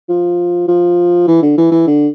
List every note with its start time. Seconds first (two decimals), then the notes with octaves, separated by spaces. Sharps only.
0.09 F3
0.68 F3
1.27 E3
1.42 D3
1.58 E3
1.71 E3
1.87 D3